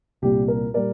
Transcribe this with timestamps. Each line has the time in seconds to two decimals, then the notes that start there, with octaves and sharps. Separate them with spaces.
0.22 C2 A#2 G3 G4
0.48 A#4
0.74 A#2 G3 A#4 D5